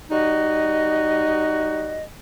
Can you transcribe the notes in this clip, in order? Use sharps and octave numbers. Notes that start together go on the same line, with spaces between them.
G3 D#4 F#4 D#5